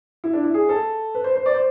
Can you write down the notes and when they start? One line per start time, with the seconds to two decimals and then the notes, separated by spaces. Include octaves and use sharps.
0.24 E4
0.33 D4
0.44 E4
0.54 G#4
0.69 A4
1.15 B4
1.24 C5
1.35 C5
1.46 D5
1.54 C5